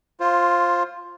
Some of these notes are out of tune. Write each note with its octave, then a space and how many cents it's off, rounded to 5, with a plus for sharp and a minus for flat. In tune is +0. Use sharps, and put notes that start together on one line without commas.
F4 +0 C5 +20